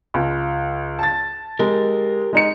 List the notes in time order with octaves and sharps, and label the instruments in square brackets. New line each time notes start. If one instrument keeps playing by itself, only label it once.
[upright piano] C#2
A5 A6
[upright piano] G#3 [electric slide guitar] G4 A#4
[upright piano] G#3 D#4 C#7